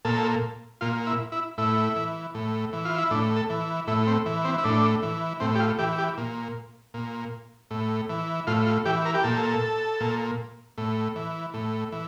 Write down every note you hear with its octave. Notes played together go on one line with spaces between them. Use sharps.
A#2 A4
A#2 F4
E4
E4
A2 E4
E3
A2
E3
F4
E4
A2 D4
A4
E3
A2 E4
C4
E3
C4
E4
A2 D4
E3
A2 C4
G4
F4
E3 G4
G4
A#2
A#2
A2
E3
A2 F4
F4
E3 G4
A#4
G4
A#2 A4
A#2
A2
E3
A2
E3